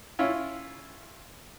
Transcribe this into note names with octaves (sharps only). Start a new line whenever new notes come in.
C#4 E4 F4